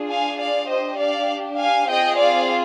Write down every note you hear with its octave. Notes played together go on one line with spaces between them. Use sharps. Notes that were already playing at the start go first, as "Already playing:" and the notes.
Already playing: D4 F4 G#4
F5 G#5
D5 F5
D4 G4 C5 D#5
D5 F5
F5 G#5
C4 F4 G#4 D#5 G5
D5 F5